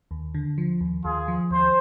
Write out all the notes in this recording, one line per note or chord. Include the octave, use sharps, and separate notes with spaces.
D#2
D3
F3
D#2
D#2 F4 G#4
F3
D#2 C5